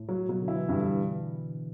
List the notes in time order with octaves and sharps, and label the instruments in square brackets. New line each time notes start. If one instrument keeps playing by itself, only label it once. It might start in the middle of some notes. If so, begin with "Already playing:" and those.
Already playing: [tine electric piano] A2
[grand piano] F#3
[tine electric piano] B2 [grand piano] F#3
[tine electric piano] D3
[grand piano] E4
[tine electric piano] E3
[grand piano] G2 [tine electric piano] E3
[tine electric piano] D3